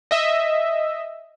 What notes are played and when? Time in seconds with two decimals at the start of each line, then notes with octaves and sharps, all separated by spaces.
0.11 D#5 E5